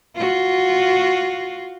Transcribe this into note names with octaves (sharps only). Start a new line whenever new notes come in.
F4 F#4